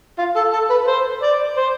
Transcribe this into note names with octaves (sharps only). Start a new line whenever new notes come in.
F4
A4
A4
B4
C5
D5
C5